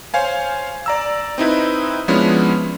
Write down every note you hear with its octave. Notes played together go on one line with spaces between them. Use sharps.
C5 C#5 F5 G#5
D5 A#5 E6
C4 D#4 E4 B4
F3 G#3 B3 C#4 D4 E4